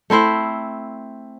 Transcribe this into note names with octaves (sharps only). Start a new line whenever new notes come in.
A3 C4 E4 C5